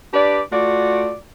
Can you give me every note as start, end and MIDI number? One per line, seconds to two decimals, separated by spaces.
0.14 0.42 62
0.14 0.42 67
0.14 0.42 71
0.14 0.42 74
0.52 1.15 57
0.52 1.15 65
0.52 1.15 66
0.52 1.15 74